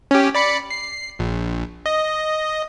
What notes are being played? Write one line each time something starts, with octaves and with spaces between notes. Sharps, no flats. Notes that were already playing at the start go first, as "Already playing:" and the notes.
C#4 G4
D5 B5 C#7
C7
A#1
D#5